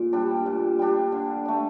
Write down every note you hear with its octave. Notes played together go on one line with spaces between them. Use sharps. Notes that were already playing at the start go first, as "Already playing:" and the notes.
Already playing: A#2
G3 D4 G4
A#2
G3 D4 G4
D3
A3 D4